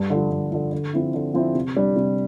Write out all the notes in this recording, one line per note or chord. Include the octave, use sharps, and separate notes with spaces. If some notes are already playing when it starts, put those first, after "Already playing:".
Already playing: G2
D3 F3
G2
D3 F3
D3
F3 C4 E4
D3
F3 C4 E4
C3
G3 D4
C3